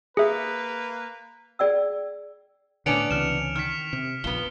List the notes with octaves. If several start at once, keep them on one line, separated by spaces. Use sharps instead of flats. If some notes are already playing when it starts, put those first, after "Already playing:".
A#3 G#4 B4 E5
G#4 D5 G5 E6
A2 D3 B3 C#4 D4 C#7 D7 F7
C#2 C3 E3 F6 E7
D#3 F6 B6
C3
F1 A#1 F3 B3 G7